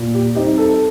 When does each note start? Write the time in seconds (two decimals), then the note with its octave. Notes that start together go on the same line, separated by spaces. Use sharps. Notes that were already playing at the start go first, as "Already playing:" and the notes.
Already playing: A#2
0.15 G4
0.35 G3 C4 D#4 G4
0.58 A4